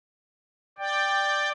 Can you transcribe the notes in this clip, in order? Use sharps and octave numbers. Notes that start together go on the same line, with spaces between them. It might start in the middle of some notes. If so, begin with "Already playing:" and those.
D5 G5